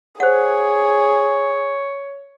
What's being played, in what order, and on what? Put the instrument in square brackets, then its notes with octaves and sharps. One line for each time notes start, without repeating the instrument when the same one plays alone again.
[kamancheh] G#4 [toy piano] C5 F#5 [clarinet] C#5